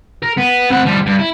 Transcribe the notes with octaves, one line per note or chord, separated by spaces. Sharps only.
A#4
B3
C4 F#5
F3 G3
G2
E4